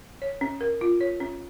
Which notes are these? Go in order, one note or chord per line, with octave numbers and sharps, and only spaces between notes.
C#5
C#4
A#4
F4
C#5
C#4